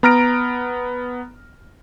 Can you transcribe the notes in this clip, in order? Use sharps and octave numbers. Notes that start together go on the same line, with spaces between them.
B3 A#5 F6 A#6 D7